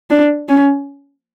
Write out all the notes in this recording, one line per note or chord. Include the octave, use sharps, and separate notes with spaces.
D4
C#4